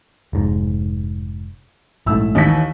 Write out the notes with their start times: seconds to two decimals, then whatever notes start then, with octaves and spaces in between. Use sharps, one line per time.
0.33 F1 G#2
2.06 A#1 G#2 A3 E4 E6
2.35 D#2 E3 B6